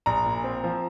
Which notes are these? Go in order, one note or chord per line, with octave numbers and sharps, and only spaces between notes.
A#1 A#5
A#2
C4
F3